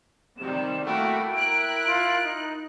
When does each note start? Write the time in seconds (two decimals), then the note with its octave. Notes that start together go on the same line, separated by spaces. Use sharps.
0.38 C3 D#3 G3 E7
0.86 A3 A#3 E4 F#4 G5 B5
1.33 E4 A#4 F#6 D7
1.86 F4
2.24 D#4